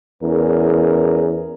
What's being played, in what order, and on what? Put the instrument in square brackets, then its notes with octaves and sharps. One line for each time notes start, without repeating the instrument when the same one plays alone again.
[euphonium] E2 [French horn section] C#4 G#4 A#4